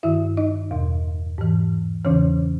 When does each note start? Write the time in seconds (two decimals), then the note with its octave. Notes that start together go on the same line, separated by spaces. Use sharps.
0.03 G2 D#3 E4 E5
0.37 D#4 D#5
0.71 E2 B2
1.38 G#2 E3
2.05 E2 C#3 E3 C#4 C#5